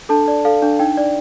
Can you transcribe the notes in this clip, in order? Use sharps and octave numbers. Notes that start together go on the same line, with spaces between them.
D4 A4 A5
D5
A4 F5
D4
D#4 G5
D5